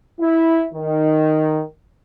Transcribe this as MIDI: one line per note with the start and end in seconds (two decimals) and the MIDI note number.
0.20 0.63 64
0.74 1.62 51